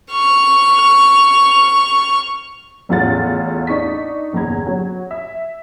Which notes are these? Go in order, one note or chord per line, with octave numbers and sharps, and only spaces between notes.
C#6 F6
A1 E2 A2 F4 F#5 A6
D4 D#4 C#6 B6
G1 E2 A#2 A#5 G#6
F#3
E5